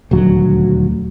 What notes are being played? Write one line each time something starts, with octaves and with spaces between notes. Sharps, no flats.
D#1 D2 F#3